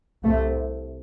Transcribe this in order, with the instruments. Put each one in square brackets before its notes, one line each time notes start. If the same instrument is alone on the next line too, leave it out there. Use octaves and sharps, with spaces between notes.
[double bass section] C2 C3 A3